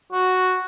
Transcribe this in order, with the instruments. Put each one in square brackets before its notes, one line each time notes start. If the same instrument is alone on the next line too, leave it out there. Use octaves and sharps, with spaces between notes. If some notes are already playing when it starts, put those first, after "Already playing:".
[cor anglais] F#4